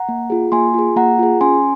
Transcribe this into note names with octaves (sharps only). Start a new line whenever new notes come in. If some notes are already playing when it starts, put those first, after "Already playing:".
Already playing: F#5 A#5
A#3
F4 G#4
A#3 G#5 C6
F4 G#4
A#3 F#5 A#5
F4 G#4
C#4 G#5 C6